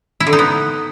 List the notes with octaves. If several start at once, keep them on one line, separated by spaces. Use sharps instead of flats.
E4
D3
D#4
B3